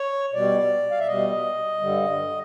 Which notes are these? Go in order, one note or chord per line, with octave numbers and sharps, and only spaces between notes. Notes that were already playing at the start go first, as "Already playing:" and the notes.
Already playing: C#5
B2 G3 D5
F5
E5
B2 G3 D#5
G2 D3 G3